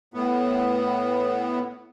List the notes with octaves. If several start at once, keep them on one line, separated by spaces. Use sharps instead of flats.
A2 B3